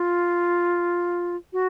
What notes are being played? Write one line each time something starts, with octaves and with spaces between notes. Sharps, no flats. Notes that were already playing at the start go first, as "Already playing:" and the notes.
Already playing: F4
F#4